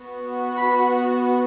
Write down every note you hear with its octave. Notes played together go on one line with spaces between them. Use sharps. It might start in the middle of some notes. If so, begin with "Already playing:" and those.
Already playing: B3 F#4
B5